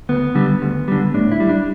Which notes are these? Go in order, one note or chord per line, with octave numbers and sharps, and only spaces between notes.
D2 B3
D3 G3
D2
D3 G3
A2 D4
E4
G3
D4